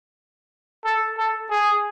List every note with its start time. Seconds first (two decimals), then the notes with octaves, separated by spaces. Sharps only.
0.85 A4
1.18 A4
1.50 G#4